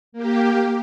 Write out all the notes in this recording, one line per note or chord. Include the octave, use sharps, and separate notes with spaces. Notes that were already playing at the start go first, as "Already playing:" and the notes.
A#3 G4